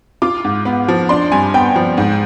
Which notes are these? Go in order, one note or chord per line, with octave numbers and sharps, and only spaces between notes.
F4 D6
G#2
B3
F3
D4 C6
G2 G#5
B3 G5
F3
G#2